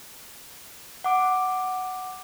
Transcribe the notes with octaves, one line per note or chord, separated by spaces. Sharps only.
F#5 D6